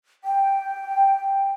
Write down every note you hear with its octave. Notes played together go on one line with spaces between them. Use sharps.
G5